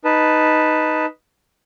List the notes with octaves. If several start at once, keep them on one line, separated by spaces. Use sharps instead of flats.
D#4 B4 A5